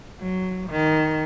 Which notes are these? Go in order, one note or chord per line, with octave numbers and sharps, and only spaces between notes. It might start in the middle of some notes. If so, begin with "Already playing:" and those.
F#3
D#3